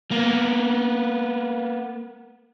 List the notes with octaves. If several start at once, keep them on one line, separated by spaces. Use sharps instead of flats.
A#3 B3